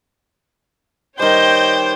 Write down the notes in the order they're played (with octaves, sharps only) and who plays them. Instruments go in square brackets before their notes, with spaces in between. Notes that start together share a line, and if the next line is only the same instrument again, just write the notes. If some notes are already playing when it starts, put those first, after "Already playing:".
[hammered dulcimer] D#3 G3 [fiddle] C5 [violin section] C#5 G5 G6 [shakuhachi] D#5